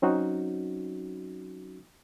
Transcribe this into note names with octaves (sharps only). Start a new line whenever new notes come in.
F#3 C4 C#4 D#4 F#4